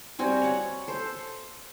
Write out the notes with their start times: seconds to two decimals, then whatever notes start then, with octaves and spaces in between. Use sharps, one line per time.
0.19 G3 C4 F#4 G#5
0.42 C#5 F#5
0.88 A4 C5